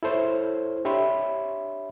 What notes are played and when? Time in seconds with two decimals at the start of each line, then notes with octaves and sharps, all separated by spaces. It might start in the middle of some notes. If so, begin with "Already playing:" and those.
0.03 E4 A4 C5 C#5
0.85 D4 G4 C#5 E5 B5 C6